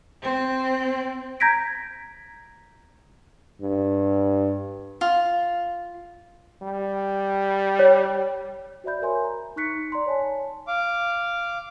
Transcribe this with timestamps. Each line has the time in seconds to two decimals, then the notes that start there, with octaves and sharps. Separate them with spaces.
0.22 C4
1.40 A#5 G6 G#6 A#6 B6 D7
3.61 G2
5.01 F4
6.62 G3
7.79 C#5
8.84 F#4 C5 D5 E5 B5 G6
9.02 A#4 C#5 E5 G#5 C6
9.24 A#5
9.56 D#4 C#6 F#6 B6 C#7
9.92 D5 A#5 C6
10.06 C#5 G#5 A5
10.67 F5 D6